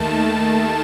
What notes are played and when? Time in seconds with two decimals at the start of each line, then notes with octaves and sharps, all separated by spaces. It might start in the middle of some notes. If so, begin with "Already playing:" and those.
Already playing: D#2 D#3 A3 A5